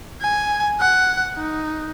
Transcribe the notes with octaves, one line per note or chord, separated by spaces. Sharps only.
G#5
F#5
D#4